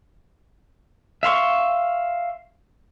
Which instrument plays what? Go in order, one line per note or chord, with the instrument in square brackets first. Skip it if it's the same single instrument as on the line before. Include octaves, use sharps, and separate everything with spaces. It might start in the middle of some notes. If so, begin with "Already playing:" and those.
[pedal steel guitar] E5 F5 C6 C#6